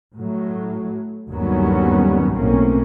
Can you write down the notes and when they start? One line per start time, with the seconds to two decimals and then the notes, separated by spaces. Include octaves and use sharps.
0.13 A2 F#3
1.31 G1 D#2 F#3 G3 B3 C#4
2.34 B1 A2 A#3 C4 C#4